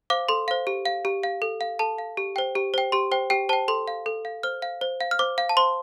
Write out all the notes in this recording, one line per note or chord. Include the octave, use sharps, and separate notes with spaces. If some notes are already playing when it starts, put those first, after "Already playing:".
C5 F5 D6
A4 C6
C5 F5
G4
F5
G4
F5
A4
F5
A4 A5
F5
G4
C5 G5
G4
C5 G5
G4 C6
C5 G5
G4 G5
C5 G5 A5
A4 C6
F5
A4
F5
C5 F6
F5
C5
F5
F6
C5 D6
F5
A5
C5 C6